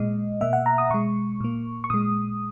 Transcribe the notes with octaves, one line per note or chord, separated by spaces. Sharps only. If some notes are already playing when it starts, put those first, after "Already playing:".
Already playing: A#2 G#3 D#5
B2 A#3 E5
F#5
A#5
D#6
B2 G#3 C#6
A#2 A#3
C#6
A#2 G#3 D#6